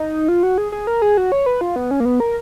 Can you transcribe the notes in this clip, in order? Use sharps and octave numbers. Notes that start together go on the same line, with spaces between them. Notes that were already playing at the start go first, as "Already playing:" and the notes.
Already playing: D#4
F4
F#4
G#4
G#4
A#4
G#4
F#4
C#5
B4
F4
B3
C#4
A#3
B3
A#4